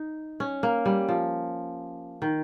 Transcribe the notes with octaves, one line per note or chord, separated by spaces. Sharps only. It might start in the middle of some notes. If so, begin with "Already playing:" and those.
Already playing: D#4
C#4
A#3
G3
F3
D#3